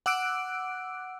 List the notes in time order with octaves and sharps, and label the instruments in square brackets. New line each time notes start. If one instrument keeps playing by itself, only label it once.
[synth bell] F#5 D6 E6 F#6 D7